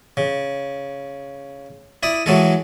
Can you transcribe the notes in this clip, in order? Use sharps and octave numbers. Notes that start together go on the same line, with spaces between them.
C#3
E4 D5 D#6
E3 F#3 G#3 A4